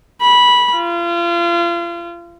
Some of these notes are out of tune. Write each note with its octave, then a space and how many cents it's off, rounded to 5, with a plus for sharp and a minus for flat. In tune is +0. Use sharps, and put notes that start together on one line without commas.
B5 -15
F4 -35